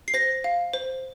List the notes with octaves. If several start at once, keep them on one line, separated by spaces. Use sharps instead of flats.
C7
C5 A#6
F5
C5